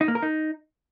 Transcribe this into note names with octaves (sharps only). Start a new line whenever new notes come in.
D#4
A#3
A#4
D#4